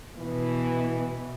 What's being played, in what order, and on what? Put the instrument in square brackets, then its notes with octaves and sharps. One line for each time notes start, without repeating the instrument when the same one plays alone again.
[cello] B2 [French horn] E3